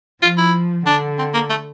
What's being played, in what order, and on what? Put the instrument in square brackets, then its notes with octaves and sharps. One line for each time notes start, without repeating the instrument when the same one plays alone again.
[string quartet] F3 [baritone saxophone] F4
[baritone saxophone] E4
[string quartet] D3 [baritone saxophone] D4
[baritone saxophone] C4
A#3
A3